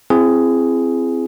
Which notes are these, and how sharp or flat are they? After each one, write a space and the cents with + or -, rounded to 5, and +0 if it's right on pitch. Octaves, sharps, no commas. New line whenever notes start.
C4 +0 E4 +40 G#4 +5